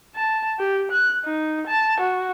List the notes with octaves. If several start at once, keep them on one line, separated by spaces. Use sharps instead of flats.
A5
G4
F#6
D#4
A5
F#4